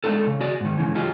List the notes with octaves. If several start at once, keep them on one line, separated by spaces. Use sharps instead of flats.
G#3 A3 C4 D4 D#4 A4
C#3
F#4 G#4 D5
G#2 D#3
G#2 C#3 E3
F#3 D#4 F4 G4 G#4